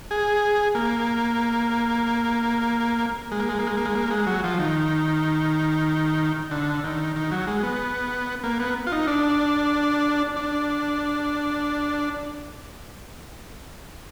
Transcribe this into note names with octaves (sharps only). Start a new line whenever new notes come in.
G#4
A#3
G#3
A#3
G#3
A#3
G#3
A#3
G#3
A#3
G#3
F#3
F3
D#3
D3
D#3
D#3
F#3
G#3
B3
A#3
B3
F4
D#4
D4
D4